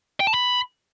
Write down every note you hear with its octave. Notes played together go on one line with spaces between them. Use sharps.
G5
A5
B5